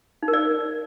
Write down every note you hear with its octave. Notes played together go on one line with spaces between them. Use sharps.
D#4
A#4
D5